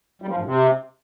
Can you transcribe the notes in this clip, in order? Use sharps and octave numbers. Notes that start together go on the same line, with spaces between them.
G3
F3
G#2
C3